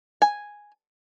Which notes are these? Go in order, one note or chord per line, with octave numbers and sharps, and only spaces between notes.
G#5